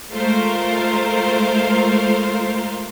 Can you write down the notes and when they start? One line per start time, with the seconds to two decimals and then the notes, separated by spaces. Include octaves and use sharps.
0.11 G#3 A3 F4 A#4 C5 F5